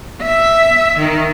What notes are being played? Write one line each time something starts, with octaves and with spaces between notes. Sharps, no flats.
E5
D#3